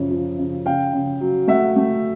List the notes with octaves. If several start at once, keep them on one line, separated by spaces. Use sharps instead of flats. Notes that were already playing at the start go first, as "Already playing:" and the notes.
Already playing: F#2 C#3 F3
F3
C#3
C#3 F5 G5
C#3
F#3
A3 E5 F#5
A3